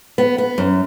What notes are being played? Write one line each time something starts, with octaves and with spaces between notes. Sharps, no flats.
B3
B3
F#2